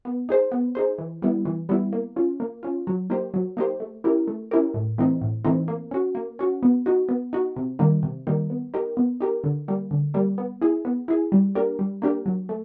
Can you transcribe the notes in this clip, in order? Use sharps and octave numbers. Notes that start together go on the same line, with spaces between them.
B3
D#4 G#4 C5
B3
D#4 G#4 C5
E3
G3 B3 E4
E3
G3 B3 E4
A#3
C#4 F4
A#3
C#4 F4
F#3
A#3 D#4 G4 C5
F#3
A#3 D#4 G4 C5
A3
C#4 E4 G4 A#4
A3
C#4 E4 G4 A#4
A2
E3 A3 C4 D#4
A2
E3 A3 C4 D#4
A#3
C#4 F#4
A#3
C#4 F#4
B3
D#4 F#4
B3
D#4 F#4
C3
D#3 G3 A#3 D#4
C3
D#3 G3 A#3 D#4
B3
D#4 G4 A#4
B3
D#4 G4 A#4
D3
G3 A#3
D3
G3 A#3
B3
E4 G#4
B3
E4 G#4
G3
A#3 D4 G4 A#4
G3
A#3 D4 G4 A#4
F#3
A3